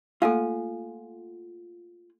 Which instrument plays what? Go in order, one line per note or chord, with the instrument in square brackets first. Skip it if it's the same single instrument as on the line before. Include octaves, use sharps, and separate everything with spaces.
[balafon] A3 A#3 [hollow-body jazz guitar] F4 F#5 G#5 [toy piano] A4 F5